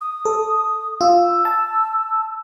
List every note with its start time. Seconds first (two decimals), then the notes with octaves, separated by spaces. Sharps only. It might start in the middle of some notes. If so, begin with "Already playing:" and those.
0.01 D#6
0.25 A4
1.01 F4 E6
1.45 A5